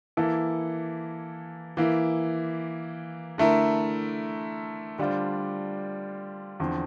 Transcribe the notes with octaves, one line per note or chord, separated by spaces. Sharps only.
E3 A#3 E4 A4
E3 A#3 E4
D3 A3 E4 A#4
D3 G3 D4 F4 C5
E2 D3 F3 C4